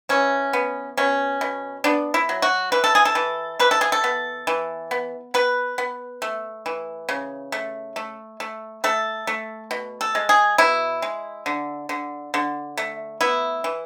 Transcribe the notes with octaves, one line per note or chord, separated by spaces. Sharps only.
E3 C#4
B3
B2 C#4
B2
B3 D4
E4
F#3
F#4
E3 B4
A4
G#4
A4
E3
E3 B4
A4
G#4
A4
B3
E3
B3
B3 B4
B3
A3
E3
C#3
A3
A3
A3
A3 A4
A3
B2
A4
G#3
G#4
B2 E4
G#3
D3
D3
D3
A3
B3 E4
E3